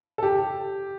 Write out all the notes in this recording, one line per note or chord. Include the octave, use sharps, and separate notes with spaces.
A4
G4